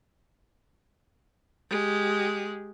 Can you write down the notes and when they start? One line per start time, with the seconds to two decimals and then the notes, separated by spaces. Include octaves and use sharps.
1.70 G#3 G4